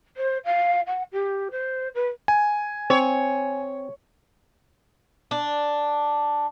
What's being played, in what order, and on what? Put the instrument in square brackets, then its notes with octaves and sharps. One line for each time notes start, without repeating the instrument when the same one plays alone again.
[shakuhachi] C5
F5
F#5
G4
C5
B4
[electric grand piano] G#5
[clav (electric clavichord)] C4 [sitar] C#5
[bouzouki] D4